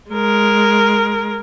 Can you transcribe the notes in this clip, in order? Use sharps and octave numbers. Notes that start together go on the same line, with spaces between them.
G#3 A#4